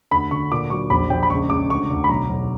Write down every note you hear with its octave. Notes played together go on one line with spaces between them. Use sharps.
D2 B5
D3 C#6
A#2 D6
F#3 C#6
A#1 B5
A#1 G5
B5
C#2 C#6
C#2 D6
D2 C#6
D2
B5
B1 A#5
B1